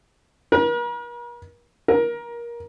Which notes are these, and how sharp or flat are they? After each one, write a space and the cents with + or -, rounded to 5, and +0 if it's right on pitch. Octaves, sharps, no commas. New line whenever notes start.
A#4 +45
A#4 +20